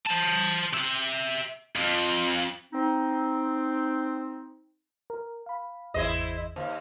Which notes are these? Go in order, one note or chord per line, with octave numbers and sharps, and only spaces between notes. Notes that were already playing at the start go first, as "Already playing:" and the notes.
C5 A5
G4 E5
F2
C4 D#4
A#4
F5 B5
G#1 E2 E4 G#4 C5 D#5
D#2 C5 F5